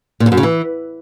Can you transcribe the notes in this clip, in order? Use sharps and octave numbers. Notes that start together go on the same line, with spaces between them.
A#2
E2
F#2
C#3
E3